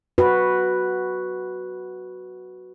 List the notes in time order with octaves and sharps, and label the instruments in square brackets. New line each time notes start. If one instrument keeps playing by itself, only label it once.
[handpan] F#4 B4